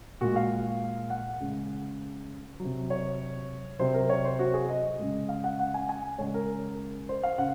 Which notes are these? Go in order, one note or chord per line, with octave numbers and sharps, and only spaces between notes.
A#2 G#3 F#4
F5
F#5
C#3 G#3
F#3
C3
C#5
C3 F#3 C5
A#4
C#5
C5
F#4
G#4
D#5
C#3 G#3
F5
F#5
F#5
G#5
G#5
C#3 G#3 C#5
A#4
C5
F5
C#3 F#5